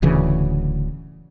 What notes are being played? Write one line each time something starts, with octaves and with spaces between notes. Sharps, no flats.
D1 D2 C#3 E3